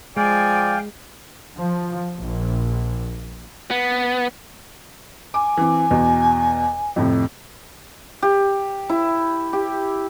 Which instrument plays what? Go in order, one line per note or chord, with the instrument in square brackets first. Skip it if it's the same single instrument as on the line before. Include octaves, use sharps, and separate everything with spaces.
[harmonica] F3 D5 [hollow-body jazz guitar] G#3 [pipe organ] F5 G5 [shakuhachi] G#5
[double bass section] F3
A#1
[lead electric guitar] B3
[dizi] G#5 [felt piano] D6
[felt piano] E3 C4
E2 B2
F2 A2 C3
[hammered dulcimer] G4
E4
G4